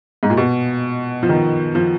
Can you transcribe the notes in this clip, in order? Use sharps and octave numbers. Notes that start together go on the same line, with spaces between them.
G#2
A#2
B2
F3
D#3
F3